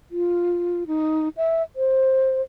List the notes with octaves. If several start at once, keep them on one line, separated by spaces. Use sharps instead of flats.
F4
D#4
E5
C5